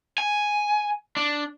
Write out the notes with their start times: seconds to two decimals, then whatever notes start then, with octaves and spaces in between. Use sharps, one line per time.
0.18 G#5
1.17 D4